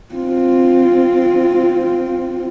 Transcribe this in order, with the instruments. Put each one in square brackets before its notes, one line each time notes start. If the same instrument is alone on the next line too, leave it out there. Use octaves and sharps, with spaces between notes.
[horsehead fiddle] C4 F4